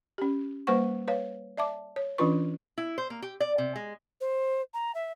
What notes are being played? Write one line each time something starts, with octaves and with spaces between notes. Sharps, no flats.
C#4 G4
G3 A#3 B4 C5 F#5 C#6
B4 C#5 F5
D5 E5 A5 D6
C#5
E3 C#4 D4 F4 B4 C#6
E4
C5
A#3
G4
D5
C3
G#3
C5
A#5
E5